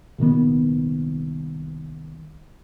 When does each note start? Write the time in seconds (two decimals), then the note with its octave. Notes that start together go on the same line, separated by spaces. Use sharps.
0.18 C2 A#2 D#3 B3